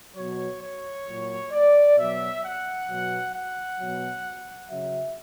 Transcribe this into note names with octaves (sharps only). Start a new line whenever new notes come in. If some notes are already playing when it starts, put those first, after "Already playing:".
B2 F#3 C#5
C#5
A#2 F#3
D5
B2 F#3 E5
F#5
B2 F#3
F#5
B2 F#3
C#3 F#3 E5